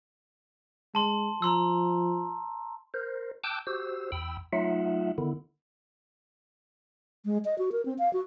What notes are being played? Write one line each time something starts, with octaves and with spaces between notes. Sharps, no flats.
G#3 A5 C6
F3 A#5 C6 E6
A#4 C5
G5 A5 D6 E6 F#6 G6
F#4 G4 C5 E6
E2 G5 B5 E6
F#3 A3 D#4 F4 E5 F#5
D3 D#3 B3 E4
G#3
D#5
F#4
A#4
C4
F5
F#4